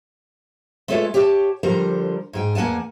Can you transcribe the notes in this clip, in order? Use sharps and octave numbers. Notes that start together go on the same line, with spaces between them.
G#3 B3 F4 A4 C#5 E5
G4 C#5 D5 F#5 G5 A5
D3 F3 G3 A#4 C5 A#5
G#2 G#4 G5
E2 A#3 F#5 G#5 A5